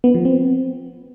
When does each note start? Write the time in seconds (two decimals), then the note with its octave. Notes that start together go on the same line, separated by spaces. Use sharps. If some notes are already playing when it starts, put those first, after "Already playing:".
0.04 B3
0.15 F3
0.25 C4